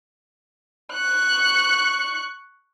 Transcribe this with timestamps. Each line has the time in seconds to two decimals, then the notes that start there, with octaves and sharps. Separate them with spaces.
0.93 C#6 F#6